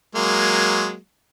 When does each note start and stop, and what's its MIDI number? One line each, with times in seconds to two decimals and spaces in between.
0.15 0.96 54
0.15 0.96 56
0.15 0.96 58